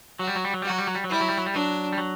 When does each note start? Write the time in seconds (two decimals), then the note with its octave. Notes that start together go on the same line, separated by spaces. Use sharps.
0.19 F#3 F#4
0.28 G3
0.36 F#3
0.45 G3
0.54 F#3
0.62 G3 F#4
0.70 F#3
0.78 G3
0.87 F#3
0.95 G3
1.04 F#3
1.09 G3 E4
1.21 F#3
1.29 G3
1.38 F#3
1.46 G3
1.54 F#3 D4
1.93 G3
1.98 F#3